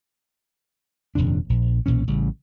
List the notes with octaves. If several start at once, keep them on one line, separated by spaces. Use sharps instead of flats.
D#1 F2 C3 D4
A#1
B1 A#2 E3 C#4
A1 C#3 G3